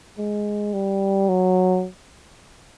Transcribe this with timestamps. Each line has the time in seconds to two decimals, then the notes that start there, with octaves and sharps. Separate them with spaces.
0.18 G#3
0.73 G3
1.29 F#3